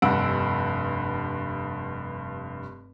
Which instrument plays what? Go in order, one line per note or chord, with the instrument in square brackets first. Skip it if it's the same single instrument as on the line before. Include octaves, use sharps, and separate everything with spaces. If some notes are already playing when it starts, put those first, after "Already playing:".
[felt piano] F1 G2 F#5 E6 D7